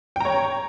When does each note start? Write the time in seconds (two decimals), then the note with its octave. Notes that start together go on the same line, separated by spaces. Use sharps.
0.16 G5
0.20 A#5
0.25 C#5